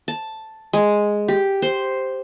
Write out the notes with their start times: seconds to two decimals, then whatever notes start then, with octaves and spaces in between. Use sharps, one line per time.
0.08 A5
0.73 G#3
1.28 G4
1.62 C5